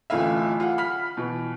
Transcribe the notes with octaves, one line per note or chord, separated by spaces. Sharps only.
D1 A1 A3 E4 F4 E5
F4 F#5
B5 F6 B6
B2 E3